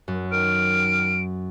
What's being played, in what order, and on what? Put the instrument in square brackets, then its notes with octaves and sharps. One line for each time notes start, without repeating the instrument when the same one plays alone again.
[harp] F#2
[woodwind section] D#3 F6 [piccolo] D7